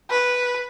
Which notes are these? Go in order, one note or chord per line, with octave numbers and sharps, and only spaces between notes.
B4